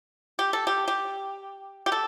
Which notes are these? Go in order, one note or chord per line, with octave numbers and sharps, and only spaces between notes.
G4
A4
G4
G4
G4
A4